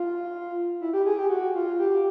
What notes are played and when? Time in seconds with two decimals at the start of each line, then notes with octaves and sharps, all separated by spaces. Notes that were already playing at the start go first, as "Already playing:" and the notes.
Already playing: F4
0.81 E4
0.93 G4
1.06 G#4
1.19 G4
1.30 F#4
1.55 F4
1.79 G4